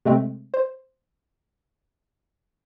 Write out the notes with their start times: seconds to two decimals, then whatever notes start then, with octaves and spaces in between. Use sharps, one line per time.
0.05 C3 G#3 A3 C4
0.54 C5